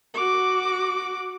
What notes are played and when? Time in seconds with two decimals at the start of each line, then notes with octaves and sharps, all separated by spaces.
0.14 F#4 D6